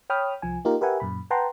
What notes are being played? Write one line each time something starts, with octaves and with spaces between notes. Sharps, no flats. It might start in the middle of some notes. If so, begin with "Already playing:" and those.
C#5 G5 B5 D#6 F6
C2 F3 G#5
A#3 D#4 F4 G4 A#4
G4 A#4 B4 E5 F#5 G#5
F#2 A#2 B5
B4 F#5 G5 A5 A#5 C6